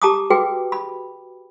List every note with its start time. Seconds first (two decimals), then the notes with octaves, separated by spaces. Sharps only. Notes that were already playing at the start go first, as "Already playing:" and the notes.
0.02 G4 A5 A#5 D6 D#6
0.30 F#4 G#4 B4 G5
0.72 B5